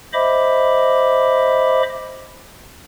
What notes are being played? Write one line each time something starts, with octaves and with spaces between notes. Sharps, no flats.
C5 D#5 E5 B5 D6